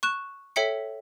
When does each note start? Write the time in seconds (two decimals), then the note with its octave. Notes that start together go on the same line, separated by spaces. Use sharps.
0.03 C#6 F#6 E7
0.56 A4 C#5 E5 G5 B6 C#7